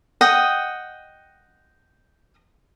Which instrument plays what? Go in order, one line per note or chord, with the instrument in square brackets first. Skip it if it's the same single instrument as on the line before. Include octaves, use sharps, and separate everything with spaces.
[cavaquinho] D#5 F#5 G5 D#6